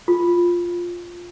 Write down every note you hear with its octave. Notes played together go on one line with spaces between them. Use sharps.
F4